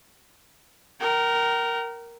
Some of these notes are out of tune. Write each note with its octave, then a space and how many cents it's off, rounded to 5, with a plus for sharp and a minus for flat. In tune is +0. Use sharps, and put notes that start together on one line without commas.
A#4 +0 G5 -40